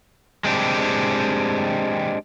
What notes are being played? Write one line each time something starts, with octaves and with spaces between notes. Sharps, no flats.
G#3 C4 D4 G4